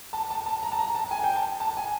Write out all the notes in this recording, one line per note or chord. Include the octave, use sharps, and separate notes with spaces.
A5
A5
A5
A#5
A5
A#5
A5
G#5
G5
A5
A5
G#5